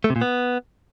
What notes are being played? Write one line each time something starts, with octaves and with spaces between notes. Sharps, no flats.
A3
C3
A#2
B3